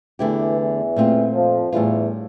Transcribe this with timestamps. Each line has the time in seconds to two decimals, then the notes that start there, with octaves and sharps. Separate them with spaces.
0.19 E2 D3 E3 A3 E4 G4
0.57 E2 E3
0.96 A#2 A3 C4 F4
1.33 F2 F3
1.72 E2 A2 E3 G3 D4 F4